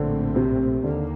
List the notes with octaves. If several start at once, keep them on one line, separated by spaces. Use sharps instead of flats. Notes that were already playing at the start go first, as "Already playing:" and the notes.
Already playing: A#1 A2 D3 A3 C4
C3
D#2 D3 D#3 A#3